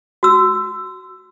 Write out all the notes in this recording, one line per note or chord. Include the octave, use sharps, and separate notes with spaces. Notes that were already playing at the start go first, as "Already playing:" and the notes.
F#4 E6